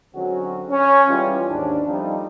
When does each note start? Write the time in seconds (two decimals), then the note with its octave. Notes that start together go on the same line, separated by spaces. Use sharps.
0.15 D3 F#3 G#3 C4 C#4 F#4
0.69 C#4
1.09 E3 G3 G#3 F4
1.49 D#2 G#2 C#4 D4
1.87 F3 G3 A3 C4 D#4